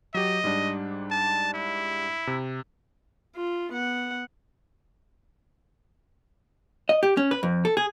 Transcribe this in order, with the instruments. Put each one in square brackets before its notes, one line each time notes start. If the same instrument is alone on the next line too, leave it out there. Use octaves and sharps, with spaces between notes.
[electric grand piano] F#3 G4 [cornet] D#5
[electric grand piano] G#2 G3 D4
[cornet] A5
E4
[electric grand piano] C3
[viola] F4
B3 F#5
[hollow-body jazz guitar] D#5
G4
C#4
B4
F2
A4
G#4